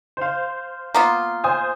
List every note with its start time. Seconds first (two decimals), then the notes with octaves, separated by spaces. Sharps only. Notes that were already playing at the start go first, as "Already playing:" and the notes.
0.17 C5 F5
0.94 A#3 B3 F4
1.44 C5 G#5 D#6